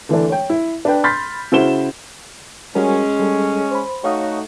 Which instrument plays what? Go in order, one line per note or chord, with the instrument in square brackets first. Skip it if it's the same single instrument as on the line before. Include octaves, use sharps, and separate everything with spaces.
[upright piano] D3 E3 A3 D4
C#5 G5
E4
D4 B4 G5
B5 C6 F6 G6 A6 B6
C#3 E4 F#4 C5 E7 G7
[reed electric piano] G3 F#4 A#4 [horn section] G#3 C#4
[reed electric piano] G3 A4
C5 B5
[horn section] A3 D#4 F#4 [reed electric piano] C#5 F5 D#6